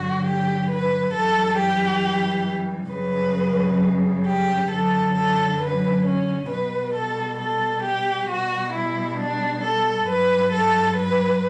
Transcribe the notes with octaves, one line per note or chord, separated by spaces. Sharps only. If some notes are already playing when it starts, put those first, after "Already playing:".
Already playing: G2 D3 F#3 F#4
G4
B4
F#2 E3 G3 A4
G4
F#2 C#3 G3 B4
G4
F#2 D3 F#3 A4
A4
B4
C#4
B2 G3 B4
A4
A4
G4
B2 G3 F#4
E4
D4
A4
G2 F#3 B4
A4
B4